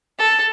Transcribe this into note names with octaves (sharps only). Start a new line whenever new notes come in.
A4